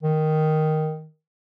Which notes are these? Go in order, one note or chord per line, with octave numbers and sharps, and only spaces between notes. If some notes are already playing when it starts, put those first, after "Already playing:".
D#3